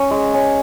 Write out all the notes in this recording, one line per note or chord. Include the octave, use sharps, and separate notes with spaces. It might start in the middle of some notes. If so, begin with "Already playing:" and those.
Already playing: C#4
G#3
C#4